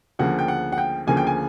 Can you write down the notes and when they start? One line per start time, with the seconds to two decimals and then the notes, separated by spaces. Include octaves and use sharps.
0.19 D2 C#3 F3 A#3 F#5
0.39 G5
0.48 F#5
0.72 F#5
0.78 G5
1.07 D2 C#3 F3 A#3 G#5
1.17 G5
1.27 G#5